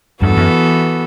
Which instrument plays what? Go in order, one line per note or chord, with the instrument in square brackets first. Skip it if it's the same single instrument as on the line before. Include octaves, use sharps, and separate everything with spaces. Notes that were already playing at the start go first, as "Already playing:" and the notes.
[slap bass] E2 G2 [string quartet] E3 B3 F#4 A4
[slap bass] F#2